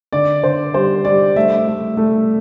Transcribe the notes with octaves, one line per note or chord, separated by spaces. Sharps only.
D3 D5
D3 C5
G3 C5
G3 D5
A3 E5
A3
A3